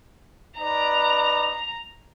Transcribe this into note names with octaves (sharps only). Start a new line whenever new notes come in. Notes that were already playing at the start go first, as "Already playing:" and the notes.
D#4 B4 D5 A#5